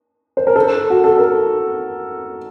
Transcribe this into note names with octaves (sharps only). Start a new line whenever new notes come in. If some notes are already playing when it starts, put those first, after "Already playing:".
C5
A#4
A4
F#4
A4
A#4